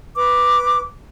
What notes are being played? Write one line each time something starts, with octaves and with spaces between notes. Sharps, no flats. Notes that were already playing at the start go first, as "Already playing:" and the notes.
B4 D6